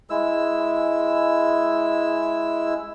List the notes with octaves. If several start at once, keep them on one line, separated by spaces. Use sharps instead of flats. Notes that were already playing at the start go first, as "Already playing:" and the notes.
G#3 E4 E6